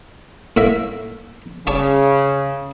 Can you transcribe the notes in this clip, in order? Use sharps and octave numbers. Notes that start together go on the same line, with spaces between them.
A2 A#3 E5
C#3 C#5 D5 A5